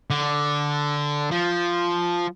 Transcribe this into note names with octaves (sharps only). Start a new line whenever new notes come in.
D3
F3